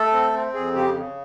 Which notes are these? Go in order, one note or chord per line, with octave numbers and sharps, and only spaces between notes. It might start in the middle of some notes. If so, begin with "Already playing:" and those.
Already playing: A3 A4
C4
C4
F2 G#4
C#3 G4
C#3